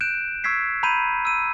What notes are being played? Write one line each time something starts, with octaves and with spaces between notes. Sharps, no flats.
F#6 G6 D7 E7
C#6 E6 G#6 B6 C7
A#5 B5 G6 D#7
E6 D#7